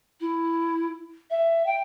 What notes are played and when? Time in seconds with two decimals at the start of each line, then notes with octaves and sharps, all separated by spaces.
0.20 E4
1.30 E5
1.66 G5